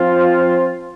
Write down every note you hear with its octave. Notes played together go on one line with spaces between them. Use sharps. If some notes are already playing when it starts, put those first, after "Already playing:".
Already playing: F3 C4 F4 C5